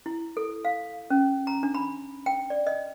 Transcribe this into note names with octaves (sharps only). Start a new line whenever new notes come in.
E4
A4
F5
C#4
A#5
D4
B5
G5
D5
D#5